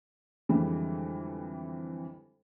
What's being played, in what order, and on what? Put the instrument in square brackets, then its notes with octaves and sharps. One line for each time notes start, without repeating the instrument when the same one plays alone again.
[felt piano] F2 D3 E3 G3 G#3